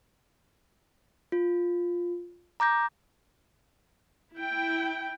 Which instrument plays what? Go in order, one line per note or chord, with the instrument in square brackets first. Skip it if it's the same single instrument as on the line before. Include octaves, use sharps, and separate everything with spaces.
[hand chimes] F4
A#5 D6 G6 A#6
[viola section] E4 G5